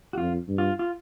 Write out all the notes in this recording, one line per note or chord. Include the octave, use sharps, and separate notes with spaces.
F#4
F2 F4
G2
F4
F4